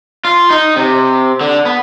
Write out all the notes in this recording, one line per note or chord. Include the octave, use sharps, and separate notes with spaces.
F4
D#4
C3
D3
B3